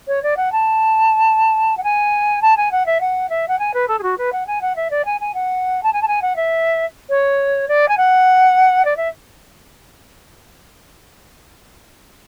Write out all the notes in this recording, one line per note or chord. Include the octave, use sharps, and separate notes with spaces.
C#5
D5
F#5
A5
F#5
G#5
A5
G#5
F#5
E5
F#5
E5
F#5
G#5
B4
A4
G#4
F#4
B4
F#5
G#5
F#5
E5
D5
G#5
G#5
F#5
A5
G#5
A5
G#5
F#5
E5
C#5
D5
G#5
F#5
D5
E5